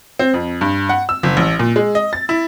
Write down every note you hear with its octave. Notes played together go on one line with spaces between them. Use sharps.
C4
F2
G2
F#5
E6
F#1
A1
A#2
G#3
D#5
A6
E4